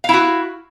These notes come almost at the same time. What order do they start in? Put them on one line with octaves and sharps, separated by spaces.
F5 E4 F#4